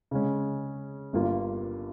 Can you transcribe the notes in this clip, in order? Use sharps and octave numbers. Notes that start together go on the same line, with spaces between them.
C#3 G#3 C#4
G1 G2 G3 A#3 F4